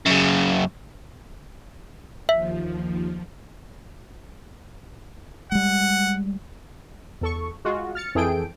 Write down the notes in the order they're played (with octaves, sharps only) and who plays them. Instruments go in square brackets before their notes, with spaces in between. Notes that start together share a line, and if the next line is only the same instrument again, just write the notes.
[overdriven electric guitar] F#2 C#3
[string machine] D#2 F3 [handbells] E5
[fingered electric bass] G3 G#3 [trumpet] F#5
[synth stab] E2 A4 C#6
G#3 F4 F#4
F6 A6 C#7
F2 E3 G#4 A4 G5 D7